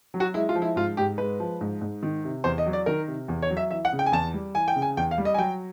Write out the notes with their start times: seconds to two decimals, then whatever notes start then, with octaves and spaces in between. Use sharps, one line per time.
0.14 F#3
0.20 F#4
0.34 G#3 E4
0.49 F4
0.55 F3
0.62 E4
0.76 G#2 F4
0.97 G#2 G4
1.18 G#3 B4
1.40 F3
1.61 G#2
1.81 G#2
2.03 D#3
2.24 C3
2.44 E2 C5
2.58 D#5
2.66 F#3
2.73 D5
2.86 D#3 A#4
3.07 C3
3.28 E2
3.42 C#5
3.50 F#3
3.57 E5
3.71 E3 E5
3.85 F#5
3.92 C#3
3.99 G5
4.06 G#5
4.12 E2 A5
4.34 G3
4.55 E3 G#5
4.68 G5
4.75 C#3
4.82 G#5
4.97 E2 G5
5.11 F5
5.18 G3
5.25 D#5
5.34 G#5
5.38 F#3 G5